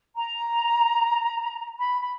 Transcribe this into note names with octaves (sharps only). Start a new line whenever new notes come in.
A#5
B5
B5